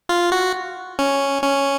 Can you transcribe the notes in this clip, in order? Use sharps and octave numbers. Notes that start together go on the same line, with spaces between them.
F4
F#4
C#4
C#4